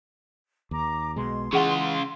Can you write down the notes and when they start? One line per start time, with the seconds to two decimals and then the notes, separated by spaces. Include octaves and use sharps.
0.71 D#2 A#5 D6
1.16 B1 B2 G#3 C6
1.53 C#3 E3 C#4 F4 G#4 F#5 A5